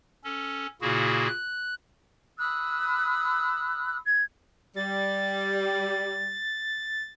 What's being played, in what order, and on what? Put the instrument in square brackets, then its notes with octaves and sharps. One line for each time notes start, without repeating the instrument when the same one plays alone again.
[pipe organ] C#4 A4
A#2 C#3 A#3 E4 F#4 G#4
F#6
[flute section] B5 D#6 E6 F#6
G#6
[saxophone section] G3 [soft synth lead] A6